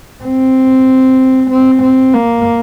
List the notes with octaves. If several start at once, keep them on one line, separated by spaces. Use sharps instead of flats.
C4
C4
C4
A#3